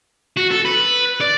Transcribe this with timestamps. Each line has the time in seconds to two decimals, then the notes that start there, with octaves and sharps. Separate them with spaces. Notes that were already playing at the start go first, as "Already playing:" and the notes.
0.37 F#4
0.51 A4
0.65 B4
1.21 D5